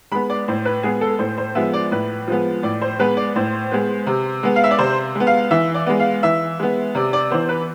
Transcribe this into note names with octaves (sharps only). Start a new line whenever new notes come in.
G#3 B3 B5
D5
A2 C5
B4
G#3 B3 G#4
A4
A2 C5
C5
F3 G#3 B3 E5
D5
A2 B4
F3 G#3 B3
A2 D5
C5
G#3 B3 B4
D5
A2 C5
G#3 B3
C3
G#3 B3
F5
E5
D5
C3 C5
G#3 B3
F5
E3 E5
D5
G#3 B3
F5
E3 E5
G#3 B3
C3 D5
D5
E3 B3 C5
B4